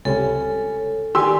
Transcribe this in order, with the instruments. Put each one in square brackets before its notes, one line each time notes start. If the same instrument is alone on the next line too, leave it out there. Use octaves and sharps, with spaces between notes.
[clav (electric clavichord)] C#2 C3 G3 [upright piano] C#4 [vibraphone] A4
[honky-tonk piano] D#3 G4 C6 [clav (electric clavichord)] F#4 [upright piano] D5 G#5 E6